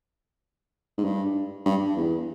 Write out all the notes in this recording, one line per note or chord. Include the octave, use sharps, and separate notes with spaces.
G#2
G2
G2
E2